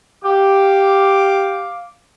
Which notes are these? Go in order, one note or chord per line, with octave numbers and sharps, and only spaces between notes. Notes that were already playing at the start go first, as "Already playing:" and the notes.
G4 F5 D6